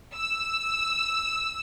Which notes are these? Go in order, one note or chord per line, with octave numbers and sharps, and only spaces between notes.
E6